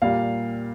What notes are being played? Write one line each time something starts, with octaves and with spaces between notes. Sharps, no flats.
A#2 G3 F5